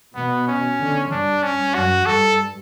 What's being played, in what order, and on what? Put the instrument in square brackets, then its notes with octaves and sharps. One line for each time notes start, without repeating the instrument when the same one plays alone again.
[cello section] B2 [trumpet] B3
[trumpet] C#4
[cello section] D3
[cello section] G2 [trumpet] D4
[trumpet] C#4
[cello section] F#2 [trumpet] F#4
[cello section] G2 [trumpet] A4